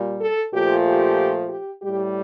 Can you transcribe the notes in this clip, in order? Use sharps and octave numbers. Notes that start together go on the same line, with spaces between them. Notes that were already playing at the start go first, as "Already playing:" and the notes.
Already playing: A#2 G3
A4
A#2 F3 A3 G4
G4
G4
A2 G3 G4